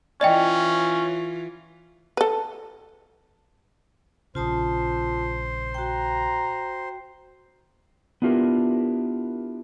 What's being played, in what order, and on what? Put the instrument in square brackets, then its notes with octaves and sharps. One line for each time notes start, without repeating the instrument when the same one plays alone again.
[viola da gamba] E3 F4 [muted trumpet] C#4 [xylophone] D5 D#5 G5
[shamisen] A4 B4
[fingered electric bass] A#1 C#3 [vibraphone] F4 A5 D#6 [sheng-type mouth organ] C5
[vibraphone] F#4 G5 [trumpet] A#5
[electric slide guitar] B3 D4 E4 F4 G4 A#4